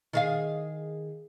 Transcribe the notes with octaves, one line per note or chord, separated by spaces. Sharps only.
D#3 G#4 F5